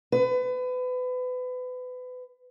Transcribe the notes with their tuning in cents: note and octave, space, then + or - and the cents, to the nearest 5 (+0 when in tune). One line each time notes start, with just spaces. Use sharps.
B4 +30